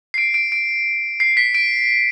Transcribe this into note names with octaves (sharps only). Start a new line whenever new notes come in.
C7
D7
D7
D7
C7
B6
D7